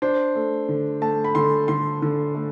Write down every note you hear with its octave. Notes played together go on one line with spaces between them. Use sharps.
D4 C5
A3
D3
A3 A5
B5
D3 C6
D3 C6
D3
A3